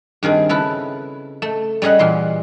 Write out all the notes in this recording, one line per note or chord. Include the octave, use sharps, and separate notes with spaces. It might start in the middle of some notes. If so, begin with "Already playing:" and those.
G2 D#3 C4 G#4
C#3 E4 A4 B4
A3
G3 C#4 G#4 D#5 F#5
A#2 E3 C6